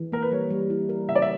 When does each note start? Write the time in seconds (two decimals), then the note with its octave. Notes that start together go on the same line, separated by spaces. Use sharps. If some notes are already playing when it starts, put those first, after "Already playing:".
Already playing: E3
0.12 A#3 A#4
0.22 B4
0.32 G3 C#5
0.50 G3
0.70 E4
0.89 A#4
1.08 C#3 E5
1.15 D5
1.22 E5